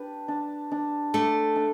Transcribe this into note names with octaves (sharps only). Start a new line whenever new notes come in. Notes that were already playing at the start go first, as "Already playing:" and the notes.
Already playing: D4 G4 B4
D4
D4
A3 D4
D4